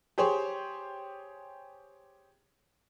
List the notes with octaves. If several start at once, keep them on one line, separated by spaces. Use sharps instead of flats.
G4 G#4 C5 C#5